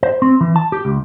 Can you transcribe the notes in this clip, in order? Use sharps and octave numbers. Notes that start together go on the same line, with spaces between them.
C5
C4
E3
A5
G4
C#2